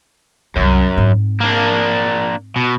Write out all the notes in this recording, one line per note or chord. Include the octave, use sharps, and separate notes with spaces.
C2 F#2 F#3
G#2 C4
A#3 D4
B2